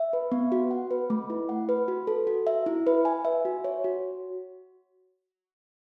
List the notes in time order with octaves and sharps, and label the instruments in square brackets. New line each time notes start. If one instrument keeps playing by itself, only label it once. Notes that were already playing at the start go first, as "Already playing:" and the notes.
Already playing: [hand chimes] E5
B4
B3
F#4
F#5
B4
A3
E4
F#5
B4
F#4
A4
F#4
E5
E4
B4
G#5
E5
F#4
C#5
F#4